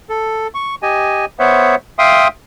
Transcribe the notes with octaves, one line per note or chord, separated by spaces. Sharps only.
A4
C#6
G4 D#5 G#5
B3 C5 C#5 E5 F#5
E5 F5 G5 C6 D#6